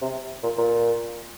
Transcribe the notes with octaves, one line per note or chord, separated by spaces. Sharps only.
C3
A#2
A#2